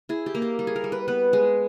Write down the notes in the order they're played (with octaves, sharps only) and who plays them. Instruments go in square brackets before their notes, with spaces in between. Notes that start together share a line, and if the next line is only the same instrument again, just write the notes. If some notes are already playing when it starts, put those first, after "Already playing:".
[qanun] E4 G#4
G4
A#3
G4
G3
G#4
A#4
G3
B4
B3 B4
G#3